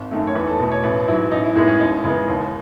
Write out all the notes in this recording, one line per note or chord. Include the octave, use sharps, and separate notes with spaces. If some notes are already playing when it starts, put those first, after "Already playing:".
Already playing: G#1
F#2 D#3 A3
C#5
E2 B4
A4
B2 A3
C#5
A1 B4
G#2 F#3 E4
A1 D#4
E4
A2 G#3 B3 D#4
C#4
D#2 D#4
C#3 E3 G#3 B3
D#2